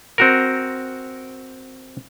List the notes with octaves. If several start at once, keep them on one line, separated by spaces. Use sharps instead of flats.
C4 F#4 A#4